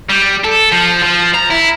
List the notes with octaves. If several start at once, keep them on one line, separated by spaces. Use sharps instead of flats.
G3
A4
F3
F3
A#5
E4